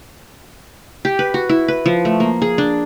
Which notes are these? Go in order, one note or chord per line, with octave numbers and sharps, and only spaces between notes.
G4
B4
F#4
E4
B4
F3
A3
A#3
G#4
D4